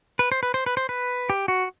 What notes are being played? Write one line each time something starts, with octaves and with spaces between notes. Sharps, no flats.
B4
C5
B4
C5
B4
C5
B4
G4
F#4